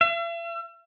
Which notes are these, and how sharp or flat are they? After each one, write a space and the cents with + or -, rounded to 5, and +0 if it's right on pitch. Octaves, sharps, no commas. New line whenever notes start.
E5 +45